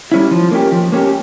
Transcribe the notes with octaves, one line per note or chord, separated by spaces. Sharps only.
G3 C#4 E4
F3
A#3 C#4 G4
F3
A#3 C#4 G4